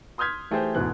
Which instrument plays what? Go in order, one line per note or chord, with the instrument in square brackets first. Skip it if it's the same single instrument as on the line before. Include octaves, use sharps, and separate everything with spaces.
[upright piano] C6 D#6 F6 G6 G#6 B6
E3 A3 G4 G#4 C5 G5
E1 D2 G#2 B2 E3 F#6